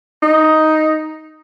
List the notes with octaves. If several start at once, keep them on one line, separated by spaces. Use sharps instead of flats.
D#4